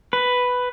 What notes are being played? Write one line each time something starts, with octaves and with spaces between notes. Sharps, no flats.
B4